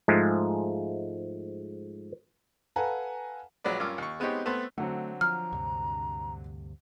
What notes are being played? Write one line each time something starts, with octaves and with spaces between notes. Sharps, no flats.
G#2 F3 G#3 A3
A4 B4 F5 F#5 G#5 A#5
A#1 F#3 G#3 B4 D5
G2 C#4 F4 A#4 D6 E6
D#2 C#6
G#3 B3 C4 D#4 G4 C#5
A3 B3 C4 B4 C5
D3 F#3 A3 C4
F3 A#5 F6
D2 G2 C3